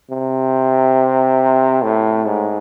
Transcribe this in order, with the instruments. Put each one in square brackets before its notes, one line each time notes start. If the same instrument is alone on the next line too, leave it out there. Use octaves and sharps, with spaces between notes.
[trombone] C3
A2
G#2